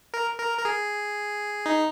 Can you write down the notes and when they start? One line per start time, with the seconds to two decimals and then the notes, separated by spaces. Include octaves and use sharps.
0.14 A#4
0.39 A#4
0.58 A#4
0.65 G#4
1.66 D#4